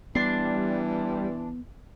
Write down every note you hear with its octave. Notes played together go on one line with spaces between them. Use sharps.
E3 G3 B3 D4 C6